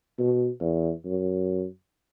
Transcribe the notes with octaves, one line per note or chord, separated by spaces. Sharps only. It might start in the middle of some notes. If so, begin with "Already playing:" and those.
B2
E2
F#2